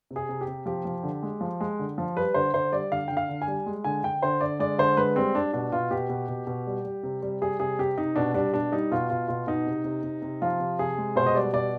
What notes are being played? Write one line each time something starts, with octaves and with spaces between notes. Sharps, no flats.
C3
G#4
C3
G4
C3
F3 G4
F3
D3
G#3
F3
G#3
D3
F3
G3 B4
D3 C5
D3 C5
G3 D5
D3 F5
D3 G5
F5
D3
G#5
G3
G#3
D3 G#5
D3 G5
D3 C5
D3 D5
G#3 D5
D3 C5
G#3 B4
G3 C4
G3 D4
B2 D4
B2 F4
B2 G4
B2
B2
B2
G3
G3
C3
G3
G3 G#4
C3 G#4
C3 G4
C3 D#4
B2 D4
G3 D4
B2 D4
G3 D#4
B2 F4
B2 F4
B2 F4
B2 D#4
C3
C3
C3
C3
F3 F4
C3
C3 G#4
G#3
B2 C5
D#5
G3 D5
B2 D5